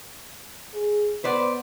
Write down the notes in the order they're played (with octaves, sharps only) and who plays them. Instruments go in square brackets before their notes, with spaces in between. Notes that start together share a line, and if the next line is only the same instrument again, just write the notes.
[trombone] G#4
[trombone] B3 [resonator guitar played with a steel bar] B4 C5 D5